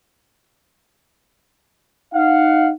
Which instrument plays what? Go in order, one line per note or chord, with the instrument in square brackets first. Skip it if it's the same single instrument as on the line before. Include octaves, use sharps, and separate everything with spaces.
[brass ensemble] D#4 F5 F#5